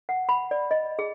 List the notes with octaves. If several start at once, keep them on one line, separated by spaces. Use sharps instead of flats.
F#5
B5
D5
D#5
G#4